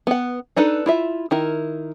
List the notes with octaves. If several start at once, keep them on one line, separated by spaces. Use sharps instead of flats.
B3 F#5
D4 D#4 A4 B4
E4 F4 E5
D#3 E4 A#4